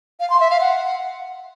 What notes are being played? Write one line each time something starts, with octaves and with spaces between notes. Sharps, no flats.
F5
C6
E5
F5
F#5